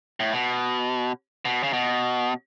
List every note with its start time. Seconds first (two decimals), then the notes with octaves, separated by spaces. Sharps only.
0.20 A2
0.33 B2
1.45 B2
1.63 C#3
1.73 B2